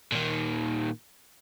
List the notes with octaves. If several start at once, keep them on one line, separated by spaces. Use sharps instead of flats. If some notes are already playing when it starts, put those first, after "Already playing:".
A#2 D#3